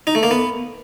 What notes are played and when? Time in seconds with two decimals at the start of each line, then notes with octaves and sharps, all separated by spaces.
0.07 D#4
0.15 A3
0.23 A#3
0.31 B3